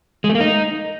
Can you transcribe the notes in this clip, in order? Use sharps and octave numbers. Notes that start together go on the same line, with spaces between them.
G#3
A3
A#3
D#4